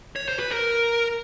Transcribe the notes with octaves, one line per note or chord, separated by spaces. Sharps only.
C#5
C5
B4
A#4